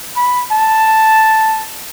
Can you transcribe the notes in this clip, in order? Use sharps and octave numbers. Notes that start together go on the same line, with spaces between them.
B5
A5